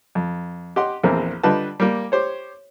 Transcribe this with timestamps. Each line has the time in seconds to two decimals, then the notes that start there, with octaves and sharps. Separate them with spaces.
0.15 F2
0.76 G4 D#5 F#5 C6 D6
1.03 A#1 E2 A3 A#3 C4
1.43 D3 G3 F4 B4 D#5 A5
1.80 G3 A#3
2.12 G4 C5 C#5